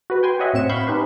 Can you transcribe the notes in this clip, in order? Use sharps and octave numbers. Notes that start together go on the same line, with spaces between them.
F#4 B4
G5 G#5 C6
F#4 C#5 D#5 E5 F#5
A2 C4 C#7 E7
F5 B5 C#6 G6
C#4 D#4 G4 B4 C5